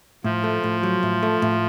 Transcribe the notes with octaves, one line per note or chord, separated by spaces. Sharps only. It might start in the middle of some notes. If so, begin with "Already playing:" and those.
A2 F3
A3
A2
F#3
A2
A3
A2